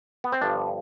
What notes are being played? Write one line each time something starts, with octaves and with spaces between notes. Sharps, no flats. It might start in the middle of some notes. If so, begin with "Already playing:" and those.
B3
C4
G1 G2 F3 D4